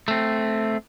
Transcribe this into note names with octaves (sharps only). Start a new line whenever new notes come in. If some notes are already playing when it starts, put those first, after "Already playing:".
A3 C4